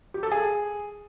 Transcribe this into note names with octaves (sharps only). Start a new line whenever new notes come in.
G4
A4
G#4